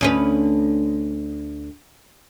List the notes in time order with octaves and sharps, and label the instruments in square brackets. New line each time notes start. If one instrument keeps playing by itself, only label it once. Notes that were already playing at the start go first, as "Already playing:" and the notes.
[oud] D2 C#4 B4